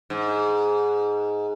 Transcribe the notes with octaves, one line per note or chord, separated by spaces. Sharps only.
G#2